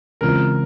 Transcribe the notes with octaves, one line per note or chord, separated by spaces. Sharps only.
C#3 E3 G#3 C4 F4 A#4